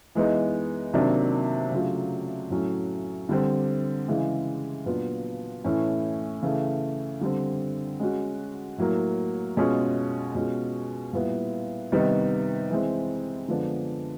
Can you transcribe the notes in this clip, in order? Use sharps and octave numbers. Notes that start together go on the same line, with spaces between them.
E3 G#3 B3 D#4
C3 D#3 F#3 A#3 D4
C#3 F#3 A3 D4 F4
A2 F#3 A3 C#4
D3 G3 C4
C#3 E3 G#3
A#2 F#3 B3 D4 F4
A2 E3 A3 C#4 E4
C#3 E3 A3
D3 G3 C4
G#3 C#4 F#4
A2 F#3 A#3
B2 G#3 C#4 F4 G#4
B2 G#3 C#4 F4 G#4
A#2 G3 B3 E4
C3 D#3 G3 B3 D#4
E3 G#3 C4
D3 F3 G#3 B3 D4